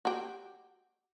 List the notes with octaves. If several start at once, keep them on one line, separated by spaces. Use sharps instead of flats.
F#4 G4